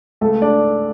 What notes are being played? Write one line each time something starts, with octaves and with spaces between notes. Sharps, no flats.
C#2 A3 A4
D4 D5